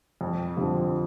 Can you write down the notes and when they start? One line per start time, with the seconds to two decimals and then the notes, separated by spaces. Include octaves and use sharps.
0.21 F2
0.57 D3 F3 C4 G4